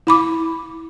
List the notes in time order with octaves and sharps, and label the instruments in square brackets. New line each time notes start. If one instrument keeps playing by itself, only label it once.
[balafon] E4 B5 D6